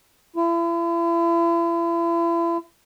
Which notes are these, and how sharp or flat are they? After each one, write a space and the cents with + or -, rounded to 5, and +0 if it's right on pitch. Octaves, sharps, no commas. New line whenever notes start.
E4 +40